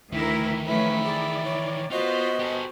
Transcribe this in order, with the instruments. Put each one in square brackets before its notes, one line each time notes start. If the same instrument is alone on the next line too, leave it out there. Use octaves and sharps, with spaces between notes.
[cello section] D2 E4 A#4 [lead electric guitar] D#3 E3
[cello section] F3 A3 C#4 [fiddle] E4 [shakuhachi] B4
[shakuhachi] G#4 [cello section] D5
[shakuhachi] C#5
[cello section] B3 [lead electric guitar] F4 [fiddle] F#4 C5 [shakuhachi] D#5
[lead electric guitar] G4 A4